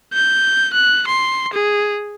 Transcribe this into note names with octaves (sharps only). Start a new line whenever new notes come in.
G6
F#6
C6
G#4